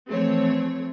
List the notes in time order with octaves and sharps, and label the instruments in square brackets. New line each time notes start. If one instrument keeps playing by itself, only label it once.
[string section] E3 F3 A3 C4 C#5